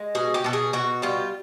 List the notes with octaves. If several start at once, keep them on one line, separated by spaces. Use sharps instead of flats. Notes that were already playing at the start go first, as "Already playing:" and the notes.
Already playing: G#3
B2 G#4
G4
B2 A4
G#4
B2 F#4
G3 F4